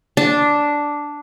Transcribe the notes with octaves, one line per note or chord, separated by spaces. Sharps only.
D4